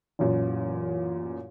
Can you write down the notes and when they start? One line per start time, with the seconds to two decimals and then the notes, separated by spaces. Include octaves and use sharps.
0.19 A1 F#2 A#2